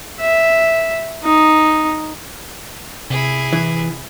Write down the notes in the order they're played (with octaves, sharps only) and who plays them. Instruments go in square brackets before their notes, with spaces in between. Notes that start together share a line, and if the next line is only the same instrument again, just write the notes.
[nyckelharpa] E5
D#4
[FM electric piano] C3 [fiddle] E4 G#4
[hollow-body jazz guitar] E3